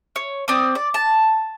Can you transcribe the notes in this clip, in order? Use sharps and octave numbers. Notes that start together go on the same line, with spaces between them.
C#5
C4 D5 D#6
D5
A5